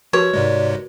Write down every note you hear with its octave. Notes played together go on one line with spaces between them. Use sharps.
F3 F#4 A#4 B4 C#5
G#2 C3 G#3 D5